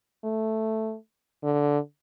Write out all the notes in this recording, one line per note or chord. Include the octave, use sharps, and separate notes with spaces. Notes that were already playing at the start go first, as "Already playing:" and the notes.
A3
D3